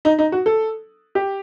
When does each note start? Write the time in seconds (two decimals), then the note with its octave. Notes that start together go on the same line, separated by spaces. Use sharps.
0.05 D#4
0.19 D#4
0.32 F#4
0.46 A4
1.15 G4